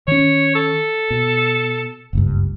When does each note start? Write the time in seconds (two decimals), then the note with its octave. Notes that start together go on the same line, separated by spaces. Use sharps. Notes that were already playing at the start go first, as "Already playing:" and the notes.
0.08 D#3 C#4 C#5
0.55 A4
1.10 B2
2.13 F#1 C#2 G2